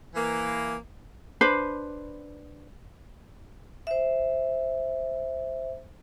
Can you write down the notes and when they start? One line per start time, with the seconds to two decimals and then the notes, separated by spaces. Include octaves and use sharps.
0.15 E3 A#3
1.41 D4 B4 C5 B5
3.87 C5 E5